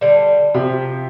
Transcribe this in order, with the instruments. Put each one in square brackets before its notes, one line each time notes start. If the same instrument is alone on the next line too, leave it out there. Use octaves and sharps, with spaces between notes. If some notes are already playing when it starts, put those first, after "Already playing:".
[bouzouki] D3 G3
[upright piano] C3 G4 [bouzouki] F3